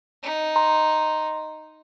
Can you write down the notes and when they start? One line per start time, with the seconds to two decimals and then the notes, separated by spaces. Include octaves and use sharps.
0.23 D#4
0.56 A#5 C6